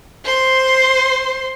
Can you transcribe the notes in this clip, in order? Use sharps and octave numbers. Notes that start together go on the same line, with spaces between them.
C5 C6